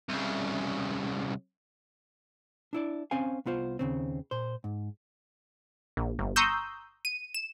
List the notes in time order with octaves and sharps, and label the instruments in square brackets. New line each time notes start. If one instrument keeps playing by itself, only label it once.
[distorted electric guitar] C2 C#3
[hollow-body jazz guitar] D4 E4 D5
C4 C#4 C5 F5 G#5
C2 B3 F4 C5
D#2 C#3 C4
A#2 C5
G#2
[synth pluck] A#1
G1
A#5 C6 C#6 D#6 E6 G6
D#7
E7